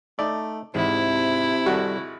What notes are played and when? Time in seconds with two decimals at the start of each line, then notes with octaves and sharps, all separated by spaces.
0.19 A3 D#4 D5 E5
0.75 E2 G#2 C3 E4
1.66 G#1 G3 F#4 A4 C#6